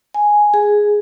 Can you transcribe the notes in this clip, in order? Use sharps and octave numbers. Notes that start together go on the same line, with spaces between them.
G#5
G#4